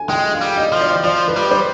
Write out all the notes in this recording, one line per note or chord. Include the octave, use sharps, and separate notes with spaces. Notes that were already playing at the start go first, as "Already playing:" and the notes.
Already playing: G#5
G#3 G5
F5
G3
D#5
F3
D5
F3 D5
B4
G3
C5